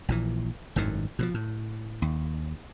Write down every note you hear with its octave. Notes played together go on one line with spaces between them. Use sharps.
A#1 A#2 E3
G#1 F#2 A2 D#3
B2 E3 F3
A2
D#2